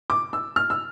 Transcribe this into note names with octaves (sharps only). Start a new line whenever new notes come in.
D6
E6
F6
E6